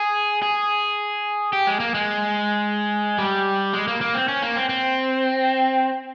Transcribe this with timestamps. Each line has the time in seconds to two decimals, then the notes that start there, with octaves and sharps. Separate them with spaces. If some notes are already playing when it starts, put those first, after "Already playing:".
Already playing: G#4
0.43 G#4
1.53 G4
1.67 G#3
1.80 A#3
1.94 G#3
3.18 G3
3.73 G#3
3.88 A#3
4.01 A#3
4.15 C4
4.28 C#4
4.42 A#3
4.56 C4
4.69 C4